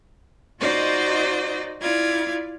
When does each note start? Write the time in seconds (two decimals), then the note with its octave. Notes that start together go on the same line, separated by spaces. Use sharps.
0.60 D#4 F4 F#4 C5 D5 D#5
1.81 E4 F4 D5 G#6